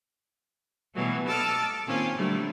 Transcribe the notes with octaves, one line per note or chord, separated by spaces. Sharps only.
B2 E3 F#3 G3 A3
A4 D#5 A5 D6 E6 F6
A#2 D#3 C4 C#4 F4 G4
D3 F#3 G3 A3